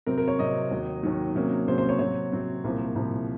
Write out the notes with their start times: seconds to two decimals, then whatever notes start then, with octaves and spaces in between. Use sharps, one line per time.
0.06 C3 F#3 C4 A#4
0.18 A#4
0.28 C#5
0.39 C3 F#3 C4 D#5
0.71 D#2 D#3 F#3
1.03 D#2 D#3 F#3
1.35 C3 F#3 A#3 C#4
1.67 C3 F#3 A#3 C#4 C5
1.78 C5
1.89 C#5
1.99 C3 F#3 C4 C#5
2.32 C3 F#3 C4
2.64 C2 A#2 F3 C4
2.95 C2 A#2 F3 C4